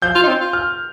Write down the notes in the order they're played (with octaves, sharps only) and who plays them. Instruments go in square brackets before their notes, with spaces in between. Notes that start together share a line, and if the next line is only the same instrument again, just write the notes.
[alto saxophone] F3 [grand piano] G6
[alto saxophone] F4
D#4
C4
F4
[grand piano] F6